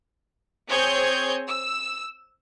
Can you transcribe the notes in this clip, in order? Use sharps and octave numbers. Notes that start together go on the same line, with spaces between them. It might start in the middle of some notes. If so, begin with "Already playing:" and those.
C4 G#4 C#5 G6 G#6
E6